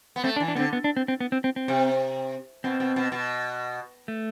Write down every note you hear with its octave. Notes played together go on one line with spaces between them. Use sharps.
B3
A3 C4
D4
E3
D4
D3 B3 C4
B3
D4
C4
C4
B3
C4
C4
C4
C3
B2 C4
B2
B2
B2
A3